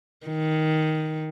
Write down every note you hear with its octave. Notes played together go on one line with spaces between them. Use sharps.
D#3